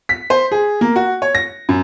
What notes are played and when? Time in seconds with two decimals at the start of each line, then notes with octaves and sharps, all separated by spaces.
0.09 B6
0.30 C5
0.51 G#4
0.81 A#3
0.96 F#4
1.22 C#5
1.35 A#6
1.69 F#2